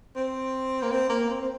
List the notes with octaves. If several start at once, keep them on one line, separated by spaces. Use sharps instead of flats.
C4
A#3
C4
A#3
C4
C4